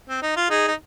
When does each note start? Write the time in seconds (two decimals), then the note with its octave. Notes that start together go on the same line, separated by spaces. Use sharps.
0.09 C4
0.22 D#4
0.36 F4
0.50 D#4 G#4
0.68 D#4